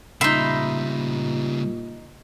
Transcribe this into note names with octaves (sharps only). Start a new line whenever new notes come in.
A#2 C#3 G3 D#4 E5 B5 C6